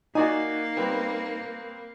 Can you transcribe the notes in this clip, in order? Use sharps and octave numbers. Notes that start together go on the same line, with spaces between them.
A#3 D#4 F#4 D5 G#5
G3 B3 C4